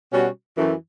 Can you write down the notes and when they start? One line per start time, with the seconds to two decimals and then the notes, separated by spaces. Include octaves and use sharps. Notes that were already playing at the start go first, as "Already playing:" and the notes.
0.11 B2 G3 C#4 F#4
0.57 F#2 E3 A3